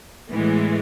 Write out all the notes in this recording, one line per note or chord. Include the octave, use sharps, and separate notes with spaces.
A2 E3 G#3 B3